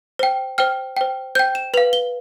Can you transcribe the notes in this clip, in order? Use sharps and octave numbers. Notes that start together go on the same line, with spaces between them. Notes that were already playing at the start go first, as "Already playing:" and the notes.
C5 G5
C5 G5 F6
C5 G5
C5 G5 G6
E7
B4 F5 F7
G7